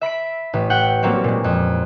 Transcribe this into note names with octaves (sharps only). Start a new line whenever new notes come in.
E5 B5 B6 D7
A1
E4 F#5 G5
F#3 G3 A#3 C4 C#4
A#2 G#3
F2